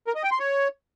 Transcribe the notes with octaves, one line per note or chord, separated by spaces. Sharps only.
A#4
D#5
G5
C6
C#5